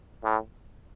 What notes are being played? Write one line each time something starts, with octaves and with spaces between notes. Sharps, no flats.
A2